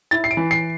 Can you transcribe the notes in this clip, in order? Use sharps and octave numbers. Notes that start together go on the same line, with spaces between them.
E4 A6
C7
D7
E3
C7